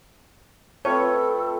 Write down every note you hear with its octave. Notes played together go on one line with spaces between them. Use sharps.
A3 C4 F4 A4 B4 C#5 G5